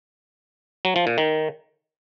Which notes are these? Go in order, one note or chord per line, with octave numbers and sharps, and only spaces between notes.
F#3
F3
A#2
D#3